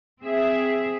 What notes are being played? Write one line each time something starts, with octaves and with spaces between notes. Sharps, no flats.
C4 G#4 E5